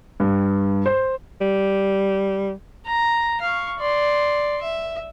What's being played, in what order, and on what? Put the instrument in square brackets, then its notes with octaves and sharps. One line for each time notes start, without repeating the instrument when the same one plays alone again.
[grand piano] G2
C5
[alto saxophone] G3
[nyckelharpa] A#5
F5 C#6
D5 C6
E5